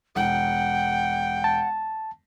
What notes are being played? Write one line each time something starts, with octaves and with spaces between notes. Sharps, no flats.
E1 F#5 G5
A5